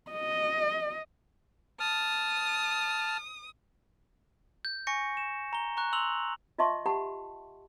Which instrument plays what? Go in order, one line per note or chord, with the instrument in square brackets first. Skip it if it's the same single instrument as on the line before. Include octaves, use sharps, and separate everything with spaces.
[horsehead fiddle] D#5
[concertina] A5 F6 [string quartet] D#6
[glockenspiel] G6
G#5 C#6 A#6 C#7
E7
A#5 G7
A#5 C#6 F#6
C6 E6 F7 F#7
[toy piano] F4 D#5 E5 A5 C6 C#6
G4 F#5 A5 B5